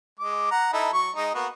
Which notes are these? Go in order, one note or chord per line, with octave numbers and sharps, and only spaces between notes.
G#3 D6
F#5 A#5
D#4 E4 A4
F#3 C#6
G#3 D#4
A#3 B3 F#4